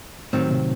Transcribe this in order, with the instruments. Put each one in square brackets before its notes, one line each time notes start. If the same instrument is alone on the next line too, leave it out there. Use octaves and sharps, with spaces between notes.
[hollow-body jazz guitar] D#2 D#3 F#3 C4 [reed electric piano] A2
[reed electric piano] C3